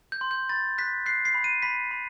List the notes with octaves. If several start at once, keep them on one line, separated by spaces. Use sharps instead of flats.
G6
C6
G6
B5 A6
F#6 B6
F#6 C7
C7
B5
D#7
B5 B6
B5